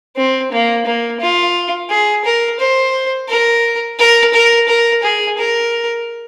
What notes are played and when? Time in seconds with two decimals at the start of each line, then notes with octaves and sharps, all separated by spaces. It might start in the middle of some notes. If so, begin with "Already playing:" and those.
0.17 C4
0.52 A#3
0.86 A#3
1.21 F4
1.90 G#4
2.25 A#4
2.60 C5
3.29 A#4
3.99 A#4
4.34 A#4
4.69 A#4
5.04 G#4
5.38 A#4